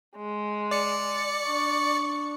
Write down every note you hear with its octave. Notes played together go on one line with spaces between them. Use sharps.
G#3
D5 C#7
D4 C#6